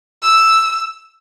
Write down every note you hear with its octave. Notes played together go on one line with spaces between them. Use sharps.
E6